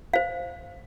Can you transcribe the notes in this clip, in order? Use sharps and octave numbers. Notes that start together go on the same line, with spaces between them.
C5 F5